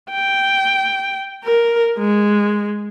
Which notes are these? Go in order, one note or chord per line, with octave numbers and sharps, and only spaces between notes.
G5
A#4
G#3